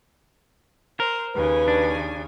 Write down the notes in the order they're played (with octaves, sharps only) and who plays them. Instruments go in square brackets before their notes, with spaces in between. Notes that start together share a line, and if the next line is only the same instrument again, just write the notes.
[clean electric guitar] A#4 [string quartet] C5
[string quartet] D#2 C#3 G#5 [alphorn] B4
[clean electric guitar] D4